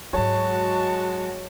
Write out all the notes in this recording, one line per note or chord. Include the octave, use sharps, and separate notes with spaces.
G#2 F#3 G#3 F#4 C#5 A5